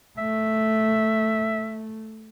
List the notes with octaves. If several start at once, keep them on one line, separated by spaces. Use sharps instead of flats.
A3 E5